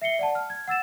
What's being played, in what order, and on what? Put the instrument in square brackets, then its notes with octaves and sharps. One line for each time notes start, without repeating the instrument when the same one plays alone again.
[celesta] E5 C7 C#7 G7
D5 F#5 A5
F6
G#6
F#5 E6 A6 E7